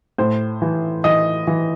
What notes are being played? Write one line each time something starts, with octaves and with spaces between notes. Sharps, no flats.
A2 C5
E3
E3 D#5
E3